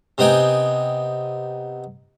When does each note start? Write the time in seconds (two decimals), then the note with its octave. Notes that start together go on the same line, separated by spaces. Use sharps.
0.18 C3 B3 D#4 G5 G#5